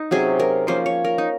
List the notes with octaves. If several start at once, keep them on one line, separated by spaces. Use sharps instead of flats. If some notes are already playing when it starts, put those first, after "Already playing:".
Already playing: D#4
C3 F#3 C#4 G#4
A#4
F3 A#3 C#4 C5
C#5
A#4
D#4